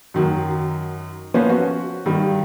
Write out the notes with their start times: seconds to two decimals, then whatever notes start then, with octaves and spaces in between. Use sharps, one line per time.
0.14 F#2 D#3 F#3
1.34 F3 A#3 B3 C#4 B4 C5
1.50 F#4
2.06 G2 D#3